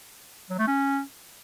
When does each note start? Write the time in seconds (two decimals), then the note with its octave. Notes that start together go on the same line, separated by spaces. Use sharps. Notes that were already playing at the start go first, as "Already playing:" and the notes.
0.50 F#3
0.59 A3
0.67 C#4